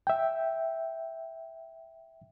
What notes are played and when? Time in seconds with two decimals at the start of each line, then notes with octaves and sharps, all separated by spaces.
0.07 E5 G5